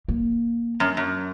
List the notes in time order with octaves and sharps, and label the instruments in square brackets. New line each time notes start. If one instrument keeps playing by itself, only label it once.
[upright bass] A#3
[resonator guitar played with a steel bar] F#2
F#2